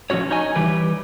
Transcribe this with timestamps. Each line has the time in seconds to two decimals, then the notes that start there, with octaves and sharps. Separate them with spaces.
0.10 F3 A3 C#4 F#4 C#5
0.30 D#4 C#5 D#5 G#5
0.56 E3 G3 B4